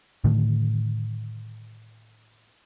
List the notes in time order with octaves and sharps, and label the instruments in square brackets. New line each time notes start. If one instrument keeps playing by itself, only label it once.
[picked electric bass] A2 D3 D#3 A3